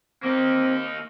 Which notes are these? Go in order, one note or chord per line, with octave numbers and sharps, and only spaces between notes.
A#3 C4 D#4